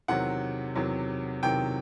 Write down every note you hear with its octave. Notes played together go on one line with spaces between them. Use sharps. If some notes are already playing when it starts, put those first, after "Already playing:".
E2 C3 D#3 F#3 F#5
E2 C3 D#3 F#3
E2 C3 D#3 F#3 G5